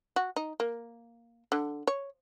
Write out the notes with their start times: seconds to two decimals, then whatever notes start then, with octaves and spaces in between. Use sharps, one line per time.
0.16 F#4
0.36 D#4
0.60 A#3
1.52 D3
1.87 C#5